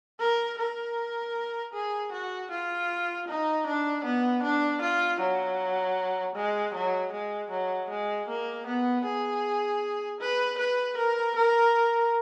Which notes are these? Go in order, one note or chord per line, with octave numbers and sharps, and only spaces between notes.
A#4
A#4
G#4
F#4
F4
D#4
D4
B3
D4
F4
F#3
G#3
F#3
G#3
F#3
G#3
A#3
B3
G#4
B4
B4
A#4
A#4